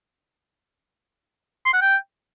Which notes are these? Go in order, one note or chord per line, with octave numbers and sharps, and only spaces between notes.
C6
F#5
G5